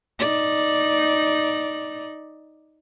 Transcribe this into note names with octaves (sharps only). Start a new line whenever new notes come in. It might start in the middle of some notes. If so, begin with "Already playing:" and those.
D#4 D5